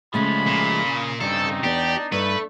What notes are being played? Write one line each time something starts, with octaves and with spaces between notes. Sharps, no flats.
C#3 F3 G#3 A3 C#4 B5
A#2
C#3
G2 C#3 C4 D#4 A4
E2 D4 G4
G2 A3 B4